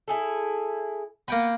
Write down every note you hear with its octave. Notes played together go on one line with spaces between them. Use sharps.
E4 G#4 A4
A#3 B3 G5 B5